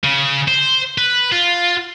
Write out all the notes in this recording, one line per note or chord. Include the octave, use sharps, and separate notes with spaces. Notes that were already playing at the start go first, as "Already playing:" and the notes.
C#3
C5
B4
F4